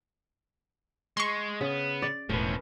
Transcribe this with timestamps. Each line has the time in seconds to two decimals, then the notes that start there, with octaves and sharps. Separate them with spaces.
1.17 G#3 C6 C#6
1.61 C#3 B3
2.02 D5
2.29 E1 A2 F3 C#4 A#4 B4